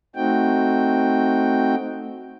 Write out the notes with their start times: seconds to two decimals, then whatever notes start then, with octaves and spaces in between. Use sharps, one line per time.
0.16 A3 C4 D#4 F#4 G5